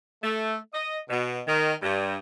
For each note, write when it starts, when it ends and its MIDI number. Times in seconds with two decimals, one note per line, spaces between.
0.23 0.56 57
0.74 0.99 75
1.09 1.40 47
1.47 1.74 51
1.82 2.16 43